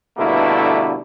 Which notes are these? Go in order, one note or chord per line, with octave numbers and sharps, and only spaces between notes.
G2 B2 D3 A3 A#3 E4